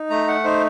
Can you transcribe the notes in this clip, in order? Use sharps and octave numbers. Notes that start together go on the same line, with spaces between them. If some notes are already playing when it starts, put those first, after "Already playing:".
Already playing: D#4
A3 A#5
F#5
D#4 C5